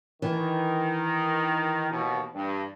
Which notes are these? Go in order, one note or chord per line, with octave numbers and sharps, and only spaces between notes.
D#3 E3
D#2 B2
G2